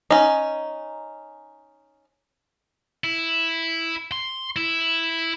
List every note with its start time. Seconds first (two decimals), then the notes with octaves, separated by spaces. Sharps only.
0.11 C#4 D#4
3.04 E4
4.12 C6
4.56 E4